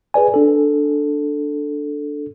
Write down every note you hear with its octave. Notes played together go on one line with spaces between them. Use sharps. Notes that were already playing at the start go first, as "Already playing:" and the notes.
G#4 B4 D5 G#5
D4 A4